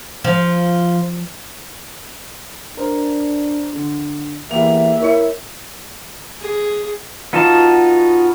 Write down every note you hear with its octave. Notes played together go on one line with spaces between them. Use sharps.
F3
D4 A#4 C5
D3
E2 A#3 G4 E5 F7
E4 A#4 C#5 C#7
G#4
B3 D#4 F4 F#4 A5